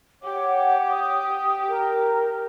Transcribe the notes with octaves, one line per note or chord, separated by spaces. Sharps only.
G4 C#5 F#5 D6
D#6
A#4